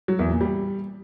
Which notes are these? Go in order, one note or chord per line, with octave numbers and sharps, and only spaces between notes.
F#3
E2
A#2
G3